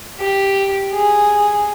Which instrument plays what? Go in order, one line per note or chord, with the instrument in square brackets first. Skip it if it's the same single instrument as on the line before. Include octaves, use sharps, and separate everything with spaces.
[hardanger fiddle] G4
G#4